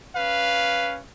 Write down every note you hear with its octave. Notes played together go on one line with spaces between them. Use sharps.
C#4 B4 F5